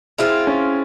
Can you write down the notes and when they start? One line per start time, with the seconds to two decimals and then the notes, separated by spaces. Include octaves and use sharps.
0.18 G#3 C4 E4 F4
0.47 C#4